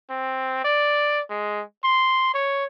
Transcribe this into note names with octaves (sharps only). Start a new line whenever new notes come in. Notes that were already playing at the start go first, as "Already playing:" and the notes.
C4
D5
G#3
C6
C#5